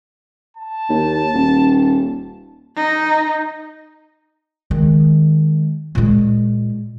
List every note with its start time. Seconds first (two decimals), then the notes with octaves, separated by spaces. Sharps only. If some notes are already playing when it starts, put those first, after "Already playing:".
0.57 A5
0.90 D#2
1.33 D#1
2.76 D#4
4.71 D#3 G#3
5.95 A#2 G#3